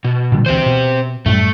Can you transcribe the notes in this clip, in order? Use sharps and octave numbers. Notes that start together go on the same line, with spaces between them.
B2
A#2 D3 G3
D2 E3 C4 G4 C5
B2
F#2 A2 G3 A3